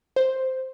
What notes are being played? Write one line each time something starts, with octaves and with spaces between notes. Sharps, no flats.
C5